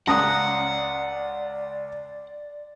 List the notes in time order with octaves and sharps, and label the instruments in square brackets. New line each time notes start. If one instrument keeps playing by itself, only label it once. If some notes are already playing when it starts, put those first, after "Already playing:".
[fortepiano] C#2 C#3 [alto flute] D5 [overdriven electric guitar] F#5 [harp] A#5 D#6 F#6